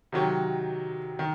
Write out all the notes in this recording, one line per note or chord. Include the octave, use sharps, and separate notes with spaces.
C3 D#3 F#3
D#3